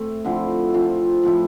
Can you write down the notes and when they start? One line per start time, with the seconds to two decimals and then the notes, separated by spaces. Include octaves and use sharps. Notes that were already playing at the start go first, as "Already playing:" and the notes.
Already playing: A3 C4
0.24 D3 F3 C4 E4
0.74 F3 C4 F4
1.23 A2 F3 C4 E4